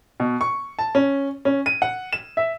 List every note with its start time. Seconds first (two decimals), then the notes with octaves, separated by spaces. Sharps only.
0.20 B2
0.41 C#6
0.79 A5
0.95 C#4
1.45 C#4
1.66 D#7
1.82 F#5
2.13 E7
2.37 E5